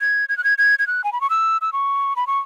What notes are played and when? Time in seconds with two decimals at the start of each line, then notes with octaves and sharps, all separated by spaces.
0.01 G#6
0.29 G#6
0.38 F#6
0.44 G#6
0.58 G#6
0.79 G#6
0.87 F#6
1.04 G#5
1.13 B5
1.21 C#6
1.30 E6
1.61 E6
1.73 C#6
2.16 B5
2.27 C#6